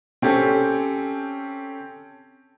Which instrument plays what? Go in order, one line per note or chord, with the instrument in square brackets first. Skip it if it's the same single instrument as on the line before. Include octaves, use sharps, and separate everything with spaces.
[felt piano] C4 C#4 G4 A4